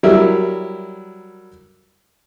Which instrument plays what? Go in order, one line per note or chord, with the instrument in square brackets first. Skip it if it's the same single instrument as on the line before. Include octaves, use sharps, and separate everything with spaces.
[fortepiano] F#3 G3 E4 A#4